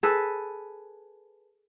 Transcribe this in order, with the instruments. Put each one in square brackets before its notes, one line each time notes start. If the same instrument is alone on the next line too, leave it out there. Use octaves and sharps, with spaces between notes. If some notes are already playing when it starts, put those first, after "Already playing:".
[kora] G#4 A4 B4